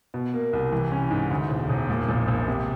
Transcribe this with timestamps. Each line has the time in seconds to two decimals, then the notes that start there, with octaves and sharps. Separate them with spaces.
0.14 B2
0.34 A#3
0.53 C2
0.72 E3
0.92 C#4
1.11 G#2
1.31 D2
1.50 E1
1.69 E1
1.90 A#2
2.09 A#1
2.28 A#1
2.48 C3